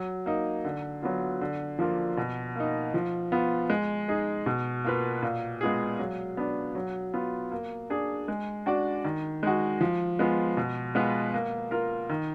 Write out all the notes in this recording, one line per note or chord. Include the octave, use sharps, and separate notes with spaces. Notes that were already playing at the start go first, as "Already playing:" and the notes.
Already playing: F#3
A#3 D#4
D3
F#3 B3 F4
D3
F3 A#3 D4 F4
B2
A#3 D#4
F3
B3 F4
G#3
D#4 G#4
B2
A#3 F4 B4
A#2
G#3 B3 F4 G#4
F#3
B3 D4
F#3
B3 F4
A#3
D4 G#4
G#3
D4 F#4 D5
D#3
G#3 D#4 F#4
F3
G#3 B3 F4
B2
G#3 B3 F4 B4
A#3
F4 A#4
D#3